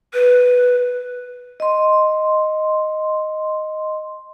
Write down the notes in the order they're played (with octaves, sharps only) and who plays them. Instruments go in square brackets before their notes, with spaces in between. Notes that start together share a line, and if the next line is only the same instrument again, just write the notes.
[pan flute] B4
[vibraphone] D#5 C6